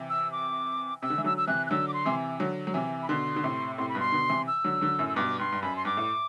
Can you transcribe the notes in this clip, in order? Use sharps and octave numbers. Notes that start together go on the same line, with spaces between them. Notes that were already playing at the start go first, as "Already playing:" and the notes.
Already playing: C3 E3
E6
D6
C3 E6
D3
E3
D3 F#3 E6
E6
C3 E3 F#6
F#6
D3 F#3 E6
D6
C6
C3 E3
D3 F#3
F#3
C3 E3
B5
B2 D3 C6
D3
A2 C3
A2 C3 C6
B5
G2 B2 C6
B2 D3
C3 E3
E6
D3 F#3
D3 F#3
F#2 A2
E6
G2 B2 D6
G2 C6
G2
F#2 B5
C6
G2 D6
A2